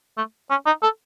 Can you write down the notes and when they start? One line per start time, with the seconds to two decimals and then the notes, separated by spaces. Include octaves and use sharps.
0.17 A3
0.50 C#4
0.66 D#4
0.83 A4